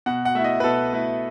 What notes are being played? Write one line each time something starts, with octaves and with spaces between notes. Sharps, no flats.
B2 F#5
F#5
A3 E4 E5
D#5
B4
B2 A4
A3 E4